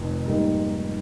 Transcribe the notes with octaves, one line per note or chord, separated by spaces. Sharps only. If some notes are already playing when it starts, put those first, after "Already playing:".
Already playing: F1 F2 D#3
G#2 G3 A#3 D#4